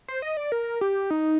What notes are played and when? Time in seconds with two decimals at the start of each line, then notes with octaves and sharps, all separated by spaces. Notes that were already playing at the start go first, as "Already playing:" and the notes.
0.08 C5
0.22 D#5
0.37 D5
0.52 A#4
0.81 G4
1.11 D#4